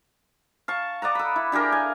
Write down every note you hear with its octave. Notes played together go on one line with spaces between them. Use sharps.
F5 A5 C#6
D5 D#5 F#5 A#5
A4 B5
E4
D4 G4 G#4 A#4
F5 G#5